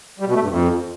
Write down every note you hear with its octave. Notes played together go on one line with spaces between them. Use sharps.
G3
B2
A3
G2
F2